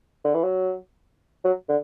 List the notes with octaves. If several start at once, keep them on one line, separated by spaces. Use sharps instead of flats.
D3
E3
F#3
F#3
D3